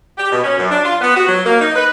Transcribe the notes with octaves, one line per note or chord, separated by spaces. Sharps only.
G4
B2
C#4
F#2
D4
F4
B3
F#4
F#3
A#3
D#4
B4